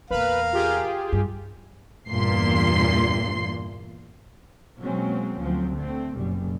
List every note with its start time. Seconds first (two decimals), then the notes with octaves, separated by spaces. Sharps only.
0.10 E2 A#2 A#4 B4 F5
0.53 F4 G4 G#4
1.13 G2
2.10 E2 G2 A#2 C6 C7
4.79 B2 F#3 G#3 A#3 C4 C#4
5.38 D2 F3 F#3 C4
5.75 D3 A3 C4
6.15 F#1 F#2 B2 G3